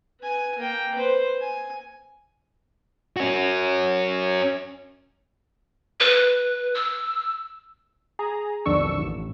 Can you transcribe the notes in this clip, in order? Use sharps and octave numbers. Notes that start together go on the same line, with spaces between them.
B4 G#5
A#3 G5
B4 C5
G#5
C#4 F#4
B4
E6
G#4 A#5
B1 F2 D#3 D4 C#6 E6
A1